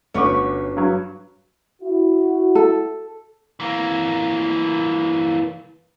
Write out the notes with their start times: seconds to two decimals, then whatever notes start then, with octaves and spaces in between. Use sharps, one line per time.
0.14 G1 A3 C#4 F#4 B4 D6
0.77 G2 F#3
1.82 E4 F#4
2.55 A4
3.60 E3 A#3